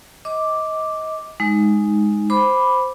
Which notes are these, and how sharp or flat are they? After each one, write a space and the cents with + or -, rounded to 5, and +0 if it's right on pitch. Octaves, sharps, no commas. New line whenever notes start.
D#5 +25 D6 +0
G#3 +0 D#4 +0
C5 +0 B5 +0 D6 +0